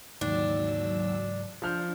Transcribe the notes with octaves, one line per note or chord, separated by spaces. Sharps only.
D#2 G#2 C#3 E3 F#3 D4 E6
F3 D4 F6 G6